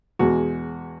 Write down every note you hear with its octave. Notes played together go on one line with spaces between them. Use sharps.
E2 B2 G#3 F#4